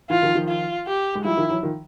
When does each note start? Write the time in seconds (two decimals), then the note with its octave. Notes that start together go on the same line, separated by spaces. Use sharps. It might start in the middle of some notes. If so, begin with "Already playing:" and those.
0.10 E3 F4
0.22 D#3 F3
0.35 D#3 F3
0.48 F4
0.87 G4
1.15 G#3
1.24 F3 G3 E4
1.37 D#3 F3
1.50 E3 F#3
1.63 D#3 F3